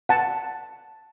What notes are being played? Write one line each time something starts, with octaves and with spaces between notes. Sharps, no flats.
F#5 A5